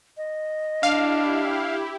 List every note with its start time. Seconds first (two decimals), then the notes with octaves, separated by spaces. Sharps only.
0.17 D#5
0.83 D4 E4 G4 F5